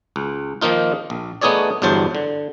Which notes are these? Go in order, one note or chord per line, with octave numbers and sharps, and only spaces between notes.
C#2
D#3 F3 A#3 D#4 F4
A#1
A3 B3 D#4 G#4 C#5 D5
G1 E2 G2 F#3 C5 A5
D3